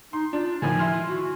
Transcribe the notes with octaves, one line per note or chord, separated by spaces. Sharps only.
D#4 C6
D4 F4
A2 D#3 F3 G#5
E4 C6 F6
F#4